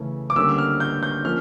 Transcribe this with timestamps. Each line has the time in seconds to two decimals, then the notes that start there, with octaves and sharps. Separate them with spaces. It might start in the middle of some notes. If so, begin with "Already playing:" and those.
Already playing: C#3 E3 A3 C#4
0.30 D6
0.36 D3 G3 A#3 C#4 E6
0.49 E6
0.58 F6
0.80 G6
1.03 G6
1.25 F3 A#3 C#4 F6